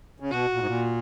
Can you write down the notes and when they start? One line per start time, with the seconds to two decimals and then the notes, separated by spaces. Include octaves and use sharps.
0.20 C#3
0.31 B2 F#4
0.53 A#2
0.60 G#2
0.67 A#2